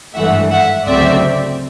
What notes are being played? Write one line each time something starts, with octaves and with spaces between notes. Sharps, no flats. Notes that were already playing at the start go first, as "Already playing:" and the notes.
G#1 G2 E3 A3 E5 F#5
E5 F#5
D2 C#3 F#3 A3 C4 D5 E5